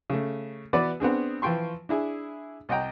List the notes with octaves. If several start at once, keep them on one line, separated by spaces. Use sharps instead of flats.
C#3 A3
E3 B3 F#4 B4 D5 D6
B3 C4 D4 G#4
E3 F3 F4 G5 C6 C#6
D4 E4 G#4
C2 D#5 F#5 G5 A#5